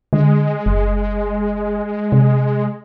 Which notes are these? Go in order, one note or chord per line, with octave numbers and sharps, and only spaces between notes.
D3 G#3
F#1
C3